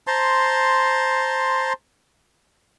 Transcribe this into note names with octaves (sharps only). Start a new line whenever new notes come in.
C5 A5 A#5 C6